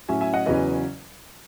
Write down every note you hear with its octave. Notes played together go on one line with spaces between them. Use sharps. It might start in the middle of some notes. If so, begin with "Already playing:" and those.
A2 F#3 C#4 E5 G#5
E5 G#5
D#5 F#5
E2 C#3 F#3 C#4 B4 D#5